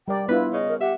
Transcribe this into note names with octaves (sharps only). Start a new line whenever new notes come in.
G3 A#4 D5 G5
B3 D4 E4 F4 B4
C#3 D#5
A#4
G4 E5 F#5